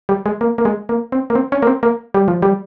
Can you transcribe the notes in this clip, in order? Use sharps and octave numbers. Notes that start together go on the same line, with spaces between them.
G3
G#3
A#3
A#3
G#3
A#3
C4
A#3
C4
C#4
A#3
C4
A#3
G3
F3
G3